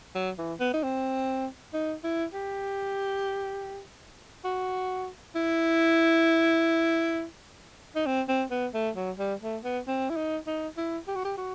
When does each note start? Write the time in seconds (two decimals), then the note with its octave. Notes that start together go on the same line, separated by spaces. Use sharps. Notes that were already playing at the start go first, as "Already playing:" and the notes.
0.15 F#3
0.38 E3
0.60 B3
0.74 D#4
0.83 C4
1.73 D#4
2.04 E4
2.34 G4
4.45 F#4
5.35 E4
7.95 D#4
8.06 C4
8.28 C4
8.51 B3
8.74 A3
8.96 F#3
9.19 G3
9.42 A3
9.64 B3
9.87 C4
10.10 E4
10.16 D#4
10.47 D#4
10.77 E4
11.08 G4
11.16 F#4
11.25 G4
11.38 F#4